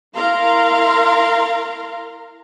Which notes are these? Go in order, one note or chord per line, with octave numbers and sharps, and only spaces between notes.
E4 A#4 F5 A#5 C6